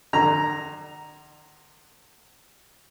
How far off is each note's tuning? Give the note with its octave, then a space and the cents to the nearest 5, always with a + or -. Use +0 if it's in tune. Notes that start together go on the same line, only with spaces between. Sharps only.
D3 +45 A#5 +0